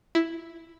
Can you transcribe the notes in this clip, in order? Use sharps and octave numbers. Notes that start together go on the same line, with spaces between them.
E4